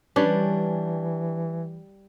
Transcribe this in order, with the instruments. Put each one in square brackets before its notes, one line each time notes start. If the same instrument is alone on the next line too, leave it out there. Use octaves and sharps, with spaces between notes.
[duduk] E3 [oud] G3 [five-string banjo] C#4 D4 B4